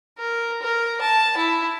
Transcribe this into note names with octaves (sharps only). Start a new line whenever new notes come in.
A#4
A#4
A5
E4